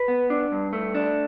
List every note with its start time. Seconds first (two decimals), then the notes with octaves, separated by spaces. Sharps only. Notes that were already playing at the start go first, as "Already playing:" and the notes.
Already playing: B4
0.08 B3
0.30 D4
0.52 G2
0.73 A3
0.95 D4